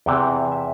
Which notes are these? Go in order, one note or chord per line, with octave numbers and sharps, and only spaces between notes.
E2 C3 E3 G5
E5